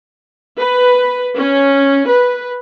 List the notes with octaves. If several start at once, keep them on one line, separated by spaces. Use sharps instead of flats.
B4
C#4
B4